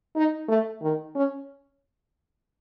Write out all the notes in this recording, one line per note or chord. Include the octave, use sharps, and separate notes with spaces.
D#4
A3
D#3
C#4